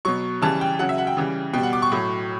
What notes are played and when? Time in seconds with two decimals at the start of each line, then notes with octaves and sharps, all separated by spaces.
0.05 B2 F#3 C#6
0.42 C#3 E3 G3 A5
0.61 G5
0.79 C#3 F#3 F#5
0.89 E5
0.98 F#5
1.07 G5
1.17 C#3 E3 G3
1.53 B2 G3 G5
1.63 F#5
1.73 D6
1.82 C#6
1.92 A2 F#3